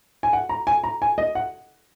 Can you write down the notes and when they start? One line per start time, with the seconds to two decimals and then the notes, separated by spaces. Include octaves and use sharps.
0.23 G#5
0.33 F#5
0.49 A#5
0.67 G#5
0.84 A#5
1.02 G#5
1.18 D#5
1.35 F#5